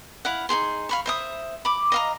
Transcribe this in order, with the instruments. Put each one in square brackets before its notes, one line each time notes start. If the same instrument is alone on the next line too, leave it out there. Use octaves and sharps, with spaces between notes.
[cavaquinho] E4 F5 F#5
D#4 E4 G#4 C6
F5 B5 C#6
C5 E5 D#6
B5 D6
D#5 F5 A#5